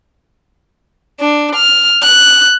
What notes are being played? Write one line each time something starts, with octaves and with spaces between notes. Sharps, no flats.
D4
F6
F#6